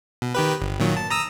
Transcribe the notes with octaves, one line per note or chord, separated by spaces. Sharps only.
B2
D#3 G4 B4
G1
A#2 D#3 F#3
A5
A#5 D#6 E6